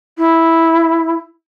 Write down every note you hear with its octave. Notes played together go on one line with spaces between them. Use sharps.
E4